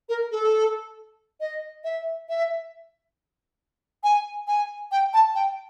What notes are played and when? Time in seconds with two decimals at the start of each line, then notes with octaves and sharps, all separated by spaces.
0.09 A#4
0.32 A4
1.40 D#5
1.84 E5
2.29 E5
4.04 G#5
4.48 G#5
4.92 G5
5.14 A5
5.35 G5